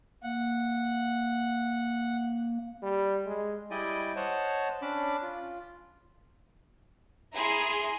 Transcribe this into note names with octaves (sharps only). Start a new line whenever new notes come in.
A#3 F#5
G3
G#3
G3 E4 D5 D#5 G5 G#5
C5 C#5 D#5 F#5 A5
C#4 D4 B5 D6
F4
E4 G#4 G#5 A#5 C6